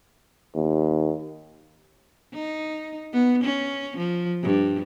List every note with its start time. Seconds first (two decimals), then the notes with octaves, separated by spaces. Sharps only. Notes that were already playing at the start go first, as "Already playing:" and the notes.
0.55 D#2
2.34 D#4
3.13 B3
3.44 C#4
3.97 F3
4.43 G2